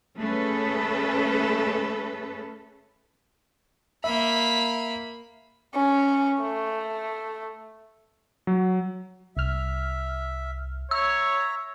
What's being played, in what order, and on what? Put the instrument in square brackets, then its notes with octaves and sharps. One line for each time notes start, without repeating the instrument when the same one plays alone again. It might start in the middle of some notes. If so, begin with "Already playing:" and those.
[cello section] A3 C#4 G#4 A4 B4
[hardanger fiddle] A#3 B5 [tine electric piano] E5
[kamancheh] C#4
A3
[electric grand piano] F#3
[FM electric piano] C2 F6 [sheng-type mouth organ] E5
[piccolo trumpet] C#5 [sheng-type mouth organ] E5 A#5 [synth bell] E6